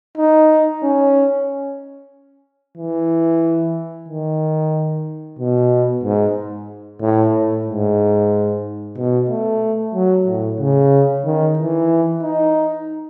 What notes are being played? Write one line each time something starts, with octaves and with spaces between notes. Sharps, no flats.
D#4
C#4
E3
D#3
B2
G#2
A2
A2
G#2
B2
A3
F#3
A2
C#3
D#3
E3
D#4